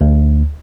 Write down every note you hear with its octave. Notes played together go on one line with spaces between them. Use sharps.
D2